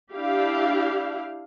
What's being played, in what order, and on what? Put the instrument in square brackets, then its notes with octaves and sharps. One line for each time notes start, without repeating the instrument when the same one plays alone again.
[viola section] D4 E4 G4 F5